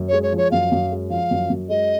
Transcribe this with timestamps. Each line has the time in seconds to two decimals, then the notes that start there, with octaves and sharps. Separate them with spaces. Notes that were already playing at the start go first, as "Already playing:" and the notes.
Already playing: F#2
0.08 G#3 C#5
0.23 C#5
0.32 F3
0.38 C#5
0.51 F#2 F5
0.72 F#2
0.91 G#3
1.10 F3 F5
1.31 F#2
1.50 F#2
1.69 G#3 D#5